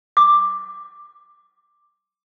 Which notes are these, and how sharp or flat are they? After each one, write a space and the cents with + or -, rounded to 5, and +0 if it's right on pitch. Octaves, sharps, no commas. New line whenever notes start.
D6 +5